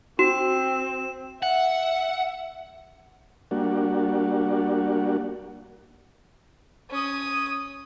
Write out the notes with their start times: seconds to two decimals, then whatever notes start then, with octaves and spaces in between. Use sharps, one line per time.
0.19 C4 F#4 E7
1.43 E5 F#5
3.51 G3 A#3 D4 F#4
6.90 C#4 D#6